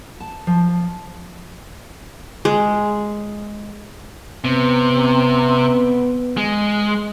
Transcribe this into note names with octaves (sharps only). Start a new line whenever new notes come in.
A5
F3
G#3
C3 B3
G#3